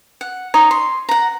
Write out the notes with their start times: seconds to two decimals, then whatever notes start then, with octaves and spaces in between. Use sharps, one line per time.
0.21 F#5
0.54 D#4 C#5 A#5
0.71 C6
1.09 F#5 A#5